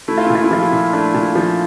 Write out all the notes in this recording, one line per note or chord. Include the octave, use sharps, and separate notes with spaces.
A3 E4
F4
A#2 E4
F4
E4
F3 F4
E4
A#2
A3 D4
A#2
F3